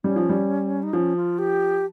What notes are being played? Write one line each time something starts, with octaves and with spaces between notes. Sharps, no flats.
G3 C#4
F3
G3
D#4
F3 C#4
F4
G4